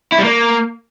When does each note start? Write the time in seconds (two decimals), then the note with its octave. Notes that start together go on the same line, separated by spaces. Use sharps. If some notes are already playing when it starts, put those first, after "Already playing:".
0.12 E4
0.18 G3
0.24 A#3